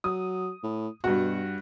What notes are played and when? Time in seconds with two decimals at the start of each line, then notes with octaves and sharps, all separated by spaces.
0.04 F#3 D#6
0.63 A2
1.04 G2 B2 F#4